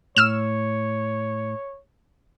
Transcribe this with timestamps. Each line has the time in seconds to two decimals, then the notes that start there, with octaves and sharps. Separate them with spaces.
0.17 A2 C#5 E6 F6 E7